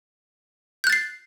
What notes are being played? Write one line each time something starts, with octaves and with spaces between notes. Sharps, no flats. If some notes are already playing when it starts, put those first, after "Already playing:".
F#6 G6 A6 C7